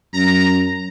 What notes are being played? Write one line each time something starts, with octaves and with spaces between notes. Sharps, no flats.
F#2 A#5